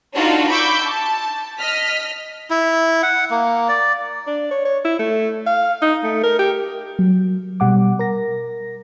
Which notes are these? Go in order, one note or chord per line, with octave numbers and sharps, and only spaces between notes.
D4 D#4 F4 F#4 A4
B5 C#6 D6 E6 G6
A5
D#5 F6 B6
E4
F#5
A#3
D5
D4
C#5
C#5
E4
A3
F5
D#4
A3
A#4
G4
F#3
B2 G3 F#5 D6
A#4 A#6